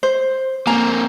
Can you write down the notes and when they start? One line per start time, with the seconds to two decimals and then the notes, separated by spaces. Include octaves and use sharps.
0.03 C5
0.67 A#3 C4 G#5 A#5